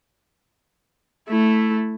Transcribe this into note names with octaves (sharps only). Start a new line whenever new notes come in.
A3 E4